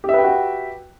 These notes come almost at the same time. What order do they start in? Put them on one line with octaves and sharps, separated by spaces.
G4 E5 B4 G5 F#4